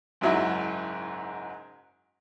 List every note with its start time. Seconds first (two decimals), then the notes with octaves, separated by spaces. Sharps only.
0.21 F#1 G#2 F#3 E4 F#4